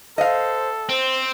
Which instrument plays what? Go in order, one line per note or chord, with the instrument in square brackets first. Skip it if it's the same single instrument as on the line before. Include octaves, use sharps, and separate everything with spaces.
[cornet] A4 [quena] C5 [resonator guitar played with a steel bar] D#5 F5
[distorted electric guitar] C4 [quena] C5